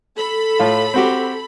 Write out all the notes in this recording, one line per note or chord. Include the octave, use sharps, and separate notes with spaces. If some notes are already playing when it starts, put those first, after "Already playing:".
A4 B5
A2 F4
C4 F#4 G4